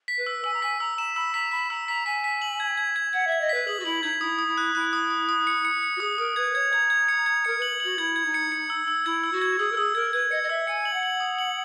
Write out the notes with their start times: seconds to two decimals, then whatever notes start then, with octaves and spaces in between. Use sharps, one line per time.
0.08 B6
0.18 B4
0.27 E6
0.44 G#5 E6
0.54 A#5
0.62 G#5 B6
0.80 A#5 E6
0.98 A#5 E7
1.16 B5 E6
1.34 A#5 B6
1.51 B5 B6
1.70 A#5 E6
1.88 A#5 B6
2.06 G#5 B6
2.24 B6
2.42 F#7
2.60 G#6
2.77 G#6
2.96 G#6
3.13 F#5 G#6
3.27 E5 G#6
3.41 D#5
3.49 B4 B6
3.67 G#4 F#7
3.80 F#4
3.85 E4 F#7
4.03 D#4 G#6
4.21 E4 D#6
4.39 D#6
4.48 E4
4.57 F#6
4.75 E4 F#6
4.93 D#6
5.10 D#6
5.29 D#6
5.47 C#7
5.65 C#7
5.83 C#7
5.96 F#4
6.00 G#4 D#6
6.18 A#4 D#6
6.36 B4 G#6
6.55 C#5 G#6
6.73 A#5 G#6
6.90 G#6
7.08 C#7
7.26 G#6
7.45 A#4 C#7
7.58 B4 F#7
7.80 F#4 F#7
7.98 E4 G#6
8.16 G#6
8.25 D#4
8.34 C#7
8.52 C#7
8.70 E6
8.88 E6
9.05 E4 G#6
9.24 E6
9.32 F#4
9.41 G#6
9.59 G#4 E6
9.72 A#4
9.77 G#4 E6
9.95 A#4 G#6
10.13 B4 G#6
10.31 D#5 C#7
10.43 D#5
10.49 E5 E6
10.67 G#5 C#7
10.85 F#7
10.93 F#5
11.03 F#7
11.20 D#6
11.38 F#7